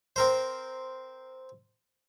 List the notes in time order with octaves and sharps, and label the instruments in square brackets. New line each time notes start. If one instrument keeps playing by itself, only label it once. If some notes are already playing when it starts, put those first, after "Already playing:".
[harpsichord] C4 A#4 C5